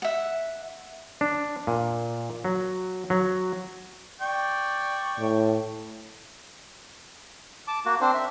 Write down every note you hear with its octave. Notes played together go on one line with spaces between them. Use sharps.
E5 F#5
D4
A#2
F#3
F#3
D5 G5 C#6
A2
A5 D6
A#3 F#4
C4 D4 C5
E5